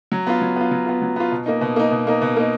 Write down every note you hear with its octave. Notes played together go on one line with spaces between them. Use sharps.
F#3
B3 F4
F#3
B3 F4
F#3
B3 F4
F#3
B3 F4
B2
A#3 D#4
B2
A#3 D#4
B2
A#3 D#4
B2
A#3 D#4